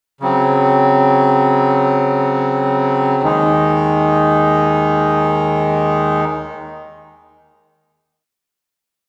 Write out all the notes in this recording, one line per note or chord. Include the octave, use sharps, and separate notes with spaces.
C#3 F#3 C4
D#2 D#3 G#3 D#4